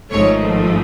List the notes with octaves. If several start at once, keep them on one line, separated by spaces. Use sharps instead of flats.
G#1 G#2 F3 A3 C#5